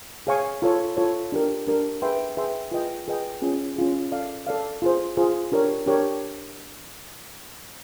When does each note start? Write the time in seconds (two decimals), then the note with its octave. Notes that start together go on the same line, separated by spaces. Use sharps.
0.27 G#4 C#5 F5 G#5 C#6
0.62 F4 A4 C#5
0.97 F4 A4 C#5
1.32 D4 G4 A#4
1.68 D4 G4 A#4
2.02 G#4 B4 E5 G5 C6
2.37 G#4 B4 E5 G5 C6
2.72 F4 G#4 B4 D#5 G5
3.07 F4 G#4 B4 D#5 G5
3.42 C#4 F4 G#4
3.76 C#4 F4 G#4
4.12 A4 D5 F5
4.47 A4 D5 F5
4.82 F4 G#4 C5
5.17 F4 G#4 C5
5.52 D4 G4 A#4 C#5
5.86 D4 G4 A#4 C#5